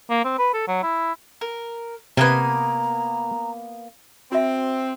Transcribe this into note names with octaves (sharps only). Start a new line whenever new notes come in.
A#3
C4
B4
A4
F#3
E4
A#4
C3 A#3 B3 B4 G#5 A#5
C4 F#4 E5